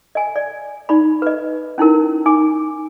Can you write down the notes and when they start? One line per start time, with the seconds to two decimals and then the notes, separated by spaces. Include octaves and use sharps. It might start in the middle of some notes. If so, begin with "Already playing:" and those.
0.15 D#5 G#5
0.36 D5
0.89 D#4 D5 B5
1.22 B4 D#5
1.78 C#4 D#4 E4 A#4
2.26 D#4 G#5 D6